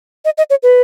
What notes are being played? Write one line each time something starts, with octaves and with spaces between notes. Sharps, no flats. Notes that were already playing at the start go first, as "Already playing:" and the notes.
D#5
D#5
C#5
B4